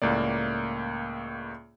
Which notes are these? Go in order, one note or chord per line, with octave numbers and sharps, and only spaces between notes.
C#2 A2 A#3 D5